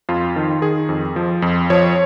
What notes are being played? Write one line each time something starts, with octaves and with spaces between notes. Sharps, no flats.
F2 F4
D#3
D#3 G#4
F2
F3
F2
F3 C#5